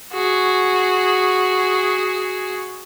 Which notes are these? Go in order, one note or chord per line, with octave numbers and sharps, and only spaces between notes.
F#4 G#4